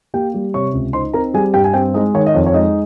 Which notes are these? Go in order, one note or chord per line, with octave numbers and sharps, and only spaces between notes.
A#3 G4 G5
G3
C3 C#5 C#6
C#2
D#4 C5 C6
C4 A#4 A#5
G3 G#4 G#5
G2 G4 G5
G#5
C4 G4 G5
G#3 D#4 D#5
D#3 C#5
D#5
F2 C#5
C#5
G#3 D#4 D#5